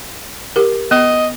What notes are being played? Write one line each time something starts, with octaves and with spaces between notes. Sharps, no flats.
G4 A#4
B3 D#5